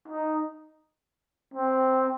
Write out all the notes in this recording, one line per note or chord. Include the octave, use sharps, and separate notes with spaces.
D#4
C4